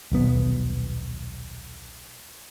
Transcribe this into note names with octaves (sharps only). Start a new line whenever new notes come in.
D#1 B1 B3